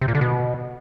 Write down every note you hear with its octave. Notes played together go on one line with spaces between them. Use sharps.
C3
A#2
D3
B2